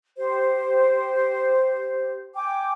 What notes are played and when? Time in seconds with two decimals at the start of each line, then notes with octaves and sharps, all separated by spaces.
0.17 G4 C5
2.34 G5 G#5 D6